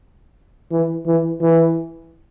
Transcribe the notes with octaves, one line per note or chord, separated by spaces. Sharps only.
E3
E3
E3